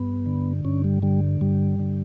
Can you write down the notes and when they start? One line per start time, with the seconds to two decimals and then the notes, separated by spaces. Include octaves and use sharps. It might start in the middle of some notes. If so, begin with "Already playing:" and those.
Already playing: G2 B3
0.26 D3
0.65 G2 C#4
0.84 G3
1.02 D3 G3
1.41 G2 G3
1.79 D3